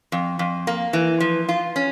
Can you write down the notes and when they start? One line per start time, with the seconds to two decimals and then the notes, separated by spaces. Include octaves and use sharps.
0.12 F2
0.39 F2
0.67 A#3
0.93 E3
1.20 F3
1.49 F4
1.76 C#4